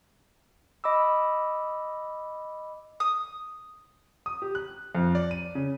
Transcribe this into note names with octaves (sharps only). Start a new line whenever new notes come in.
D#5 B5 D6 E6
D#6
D#6
G4
F#6
F2
D5
D#7
C#3